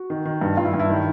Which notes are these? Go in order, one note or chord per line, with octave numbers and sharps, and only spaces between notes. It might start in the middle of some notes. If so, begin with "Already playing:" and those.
Already playing: F#4
D#3
D#3
G2
G2 F4
E4
G2
E4
D#3